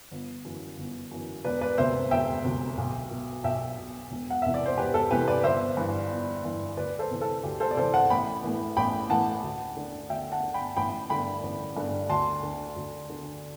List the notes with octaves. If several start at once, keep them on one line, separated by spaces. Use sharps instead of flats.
G1
F#2 E3
G1
F#2 E3
E1 B4 D5
B4 D5
D2 C3 C5 E5
E1 E5 G5
D2 C3
B1
B2
B1 E5 G5
B2
E1
F#5
E2 C3 E3 E5
D5
C5
E1 G4 B4
A4
E2 C3 E3 G4 B4
B4 D5
G1 C5 E5
G2 E3
G1
G2 E3
D2 B4 D5
A4 C5
C3 E3
A4
D2 G4
A4 C5
D5
C3 E3 A4 C5
F#5 A5
A1 G5 B5
A2 E3
A1 G5 B5
A2 E3 F#5 A5
D2
D3
D2 E5 G5
F#5 A5
D3
G5 B5
A1 G5 B5
G2 D3 G5 B5
A1
G2 D3
D2 A5 C6
D3
D2
D3